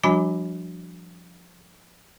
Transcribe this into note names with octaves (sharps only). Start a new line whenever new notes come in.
F3 G3 D4 F#4 G#5 B5